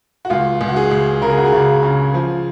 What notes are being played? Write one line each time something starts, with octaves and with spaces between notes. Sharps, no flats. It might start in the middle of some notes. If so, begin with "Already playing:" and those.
F#4
C#2 F4
C#2
F#4
G#4
C#2
C#3 A#4
G#4
F#4
G#4
C#3
C#3
F3